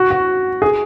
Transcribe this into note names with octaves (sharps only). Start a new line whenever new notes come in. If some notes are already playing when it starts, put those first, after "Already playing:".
Already playing: F#4
F#4
G#4